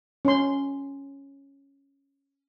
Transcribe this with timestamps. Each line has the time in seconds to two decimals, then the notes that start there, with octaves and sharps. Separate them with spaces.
0.25 C#4 C6